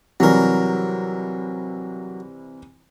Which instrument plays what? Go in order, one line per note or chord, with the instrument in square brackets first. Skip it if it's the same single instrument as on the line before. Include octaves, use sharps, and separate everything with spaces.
[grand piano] C3 E3 G3 [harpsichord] F#3 A#4